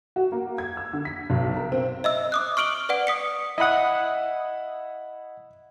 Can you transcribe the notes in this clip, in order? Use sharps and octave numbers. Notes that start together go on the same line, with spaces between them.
F#4
A#3
G#6
E6
D3
B6
B1
A#4
C4
D#5 E5 E6
D6 D#6 F#6
C#6 F6 D7 F#7 G7
B4 D5 F#5 D7
D#6 B6 C#7
E4 D#5 F#5 B5 D#6